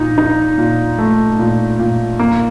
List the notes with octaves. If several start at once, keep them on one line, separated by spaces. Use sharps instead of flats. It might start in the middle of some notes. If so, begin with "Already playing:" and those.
Already playing: A#2 D#4
D#4
A#2
A3
A#2
A#2
A#3